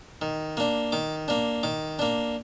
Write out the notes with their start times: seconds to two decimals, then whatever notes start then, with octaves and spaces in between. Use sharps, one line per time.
0.22 D#3
0.57 A#3 D4
0.92 D#3 D6
1.28 A#3 D4
1.63 D#3 D6
1.99 A#3 D4